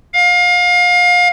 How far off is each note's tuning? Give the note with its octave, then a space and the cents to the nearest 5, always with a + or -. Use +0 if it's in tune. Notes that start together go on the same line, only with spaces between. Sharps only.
F5 +30